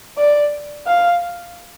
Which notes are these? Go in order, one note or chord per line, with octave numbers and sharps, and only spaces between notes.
D5
F5